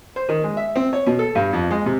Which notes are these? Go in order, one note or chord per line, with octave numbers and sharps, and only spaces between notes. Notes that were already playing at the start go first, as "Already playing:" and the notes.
C5
D#3
G#3
E5
C4
C#5
B2
A4
G2
F2
G#3
C3